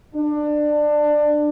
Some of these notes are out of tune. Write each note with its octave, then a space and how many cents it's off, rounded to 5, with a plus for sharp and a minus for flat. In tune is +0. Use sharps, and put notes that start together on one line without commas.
D4 +20